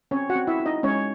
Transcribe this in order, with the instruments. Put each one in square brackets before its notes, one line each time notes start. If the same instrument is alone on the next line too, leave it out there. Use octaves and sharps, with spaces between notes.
[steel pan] C4 C#4 C#5
F#4 F#5
C4
E4 E5
E4
D#4 D#5
G#3 C#4 C#5